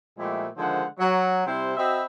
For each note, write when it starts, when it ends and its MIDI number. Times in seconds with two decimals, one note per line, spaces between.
0.18 0.47 46
0.18 0.47 53
0.18 0.47 56
0.18 0.47 57
0.18 0.47 64
0.18 0.47 67
0.57 0.84 50
0.57 0.84 51
0.57 0.84 53
0.57 0.84 56
0.57 0.84 72
0.57 0.84 78
0.99 1.44 54
1.46 1.73 48
1.46 1.73 55
1.46 1.73 60
1.46 1.73 64
1.46 1.73 72
1.77 2.04 60
1.77 2.04 66
1.77 2.04 75
1.77 2.04 76
1.77 2.04 83